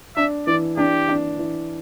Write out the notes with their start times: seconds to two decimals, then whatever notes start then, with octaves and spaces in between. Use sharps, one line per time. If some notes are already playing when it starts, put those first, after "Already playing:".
0.17 D4 E5
0.47 E3 D5
0.77 D4 G4
1.08 D4
1.38 E3